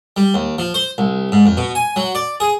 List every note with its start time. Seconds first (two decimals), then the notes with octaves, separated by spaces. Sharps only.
0.16 G3
0.34 D#2
0.58 F3
0.74 C5
0.98 C2
1.32 G#2
1.46 F2
1.57 B2
1.75 G#5
1.96 F#3
2.15 D5
2.40 G#4